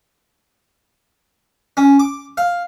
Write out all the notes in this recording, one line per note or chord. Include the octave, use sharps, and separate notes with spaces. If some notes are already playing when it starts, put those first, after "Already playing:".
C#4
D6
F5